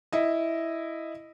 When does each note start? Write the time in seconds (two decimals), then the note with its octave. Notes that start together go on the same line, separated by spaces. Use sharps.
0.13 E4 D#5